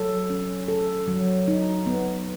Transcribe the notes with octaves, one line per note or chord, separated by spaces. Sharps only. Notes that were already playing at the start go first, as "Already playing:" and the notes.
Already playing: F#3 A4
C#4
A4
F#3
D#4
B3